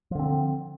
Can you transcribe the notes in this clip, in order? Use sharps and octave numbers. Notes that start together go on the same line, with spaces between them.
D3 F3 C4